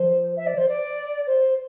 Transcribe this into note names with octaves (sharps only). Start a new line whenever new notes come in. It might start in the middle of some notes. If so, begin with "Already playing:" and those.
Already playing: F3 C5
E5
D5
C5
D5
C5